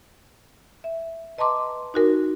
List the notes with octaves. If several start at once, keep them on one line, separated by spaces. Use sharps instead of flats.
E5
B4 D#5 A5 A#5 C6 D6
D#4 F#4 A#4